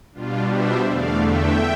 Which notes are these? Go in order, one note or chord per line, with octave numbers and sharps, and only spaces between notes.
B2 G3 D4 F4
C5 E5
E2 D3 A3 D5 F5
E5 G5